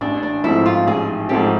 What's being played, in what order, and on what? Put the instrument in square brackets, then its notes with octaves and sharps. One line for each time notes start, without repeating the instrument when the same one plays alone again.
[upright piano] A1 [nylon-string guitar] D4
[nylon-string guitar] D4
[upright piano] G#2 F3 A3 C4 [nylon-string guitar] E4
[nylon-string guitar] F4
[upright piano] A1 [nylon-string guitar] G#4
[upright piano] G#2 F3 A3 C4 [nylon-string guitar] G4